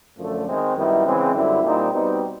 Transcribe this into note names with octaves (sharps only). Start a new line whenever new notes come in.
F#2 D3 F3 A3
D#3 G#3 C4
F#2 D#3 G3 B3 E4
C#3 E3 G#3 C4
F#2 D3 G3 C4 E4
A#2 G3 C4 D#4
B2 G3 C4 D#4